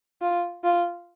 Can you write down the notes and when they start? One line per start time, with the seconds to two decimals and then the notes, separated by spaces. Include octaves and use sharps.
0.22 F4
0.64 F4